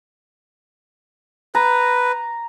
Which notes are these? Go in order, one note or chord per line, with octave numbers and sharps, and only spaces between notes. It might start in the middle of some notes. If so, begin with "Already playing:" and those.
B4 A#5